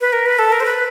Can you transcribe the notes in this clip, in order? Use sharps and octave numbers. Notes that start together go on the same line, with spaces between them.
B4
A#4
B4
A4
A#4
C5
B4